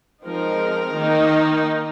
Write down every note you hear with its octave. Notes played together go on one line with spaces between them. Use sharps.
F3 G#3 C4 D#4 A#4
D#3 A#3 D#4